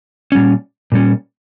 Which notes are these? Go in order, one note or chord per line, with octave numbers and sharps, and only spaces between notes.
A#2 G3 C#4
A#2 G3 C#4